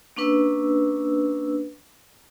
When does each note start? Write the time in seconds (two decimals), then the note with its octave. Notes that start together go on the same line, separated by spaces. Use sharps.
0.17 A#3 C#4 D4 B4 E6